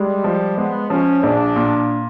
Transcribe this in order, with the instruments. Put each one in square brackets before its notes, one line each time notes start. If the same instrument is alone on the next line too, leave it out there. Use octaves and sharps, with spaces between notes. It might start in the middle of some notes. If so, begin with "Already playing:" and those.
Already playing: [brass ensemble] G3 [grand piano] G#3
[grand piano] F3
[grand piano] G#3 [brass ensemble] B3
[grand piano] F3 [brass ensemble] C#4
[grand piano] A#1 [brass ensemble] D4
[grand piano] A#2